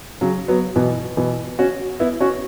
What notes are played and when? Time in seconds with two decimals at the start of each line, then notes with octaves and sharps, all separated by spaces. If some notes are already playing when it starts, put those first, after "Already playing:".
0.21 C#3 F#3
0.48 F#3 B3
0.76 B2 E3
1.17 B2 E3
1.59 C#4 F#4
2.00 B3 E4
2.20 C#4 F#4